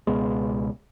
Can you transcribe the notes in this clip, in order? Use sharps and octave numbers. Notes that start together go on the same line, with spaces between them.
C#2 B2 G#3 B3